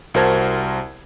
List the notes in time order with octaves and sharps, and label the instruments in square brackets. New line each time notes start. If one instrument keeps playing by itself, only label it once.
[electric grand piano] C2 F#4 A#4 C5 A5 G#6